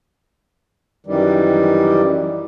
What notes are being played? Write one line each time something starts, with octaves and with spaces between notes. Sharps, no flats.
F#2 D#3 E3 G3